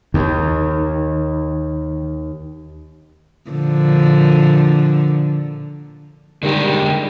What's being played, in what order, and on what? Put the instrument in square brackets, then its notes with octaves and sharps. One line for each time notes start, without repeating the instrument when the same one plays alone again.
[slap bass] D#2 [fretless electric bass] D#3
[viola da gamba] A#2 D3 F3
[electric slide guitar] D3 G#3 G4 [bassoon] D#3 [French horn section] G3